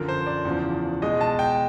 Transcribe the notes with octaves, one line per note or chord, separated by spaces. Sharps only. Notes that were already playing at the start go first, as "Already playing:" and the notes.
Already playing: F#2 D3 F3 A#4
C5
D5
E2 C#3 F3
B2 G#3 D#5
A5
G5